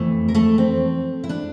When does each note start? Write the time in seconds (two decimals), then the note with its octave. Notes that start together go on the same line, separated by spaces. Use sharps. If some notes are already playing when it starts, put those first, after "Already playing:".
Already playing: F2 E3 A3
0.28 A#4
0.35 A3 A4
0.58 C4
1.24 E4
1.29 D4